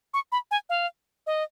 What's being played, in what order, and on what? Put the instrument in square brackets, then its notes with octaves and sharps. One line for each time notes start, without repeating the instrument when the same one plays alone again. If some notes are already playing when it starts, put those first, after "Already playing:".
[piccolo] C#6
B5
G#5
F5
D#5